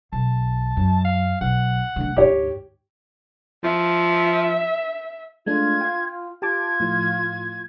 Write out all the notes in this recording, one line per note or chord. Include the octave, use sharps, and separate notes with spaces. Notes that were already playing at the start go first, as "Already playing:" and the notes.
B1 A5
F#2
F5
B1 F#5
D3 A3
D2 G#2 G4 C#5
F3 E5
G#3 A3 D4 F4 G#6
F5 G5
F4 G4 A5 D6 G#6
A2 F3